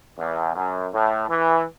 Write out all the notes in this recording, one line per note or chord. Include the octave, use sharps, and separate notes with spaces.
E2
F#2
A2
E3